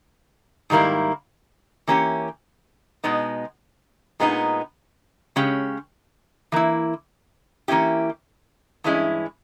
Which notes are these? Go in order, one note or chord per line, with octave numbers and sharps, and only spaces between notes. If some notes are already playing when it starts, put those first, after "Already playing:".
G#2 D#3 G3 A#3 E4
E3 A#3 C#4 G4
B2 G#3 B3 D#4
A#2 G#3 B3 D#4
C#3 G#3 C#4 G4
E3 A#3 E4
E3 A#3 C#4 E4 G4
G2 E3 G#3 C#4 E4